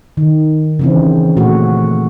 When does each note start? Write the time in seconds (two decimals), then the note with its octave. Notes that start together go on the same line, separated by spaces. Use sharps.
0.17 D#3
0.79 C#3 E3 C4
1.37 A#2 A3 F#4